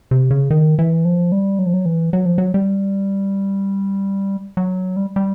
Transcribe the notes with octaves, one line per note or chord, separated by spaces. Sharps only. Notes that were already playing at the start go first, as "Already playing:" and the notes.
C3
C#3
D#3
E3
F3
G3
F#3
F3
F#3
E3
F#3
F3
F#3
G3
F#3
G3
G3